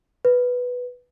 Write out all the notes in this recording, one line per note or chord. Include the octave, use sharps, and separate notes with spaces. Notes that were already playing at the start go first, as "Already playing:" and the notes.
B4